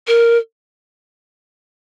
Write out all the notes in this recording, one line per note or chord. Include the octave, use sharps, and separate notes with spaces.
A#4